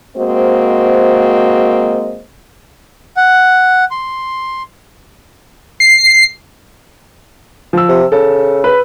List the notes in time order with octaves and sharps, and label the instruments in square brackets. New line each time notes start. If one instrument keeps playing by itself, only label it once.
[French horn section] G#3 A#3 C4 F#4 C5 D#5
[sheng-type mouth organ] F#5
C6
[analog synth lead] C7
[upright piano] F3 E6
[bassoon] C3
[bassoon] C#3 [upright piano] A4
[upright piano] B4